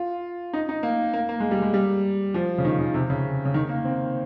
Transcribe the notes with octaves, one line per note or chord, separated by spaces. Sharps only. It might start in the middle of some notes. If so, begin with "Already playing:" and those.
Already playing: F4
D#4
D#4
A#3
A#3
A#3
G#3
G3
G#3
G3
F3
C#3
D#3
C#3
C3
C#3
C#3
D#3
A#3
C4